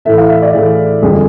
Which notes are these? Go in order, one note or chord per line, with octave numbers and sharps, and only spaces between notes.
A2 E3 A3 E5
F5
E5
D5
A2 E3 A3 G#4
F2 D3 G3 G#4